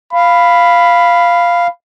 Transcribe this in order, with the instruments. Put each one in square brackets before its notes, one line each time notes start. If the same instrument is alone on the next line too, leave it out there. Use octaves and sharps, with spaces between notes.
[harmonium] F5 [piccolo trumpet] B5